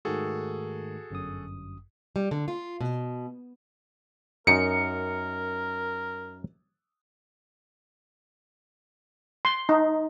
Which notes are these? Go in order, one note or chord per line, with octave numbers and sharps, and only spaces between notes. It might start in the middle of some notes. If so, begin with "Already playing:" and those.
G#2 D#3 A3 F#4 G#4 A4
G1 F#2 D#6
G3
D3
F4
B2
F#2 D#4 A#4 C#7
C6
D#4